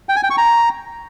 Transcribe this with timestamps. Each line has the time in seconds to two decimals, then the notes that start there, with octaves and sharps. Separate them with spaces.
0.09 G5
0.16 G#5
0.23 G5
0.30 C#6
0.38 A#5